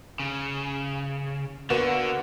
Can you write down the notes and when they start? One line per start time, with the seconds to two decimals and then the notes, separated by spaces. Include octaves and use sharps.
0.20 C#3
1.70 D3 A#3 B3 F#4